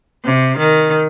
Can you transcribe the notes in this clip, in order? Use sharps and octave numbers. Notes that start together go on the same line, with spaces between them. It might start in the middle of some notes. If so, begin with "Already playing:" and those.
C3
D#3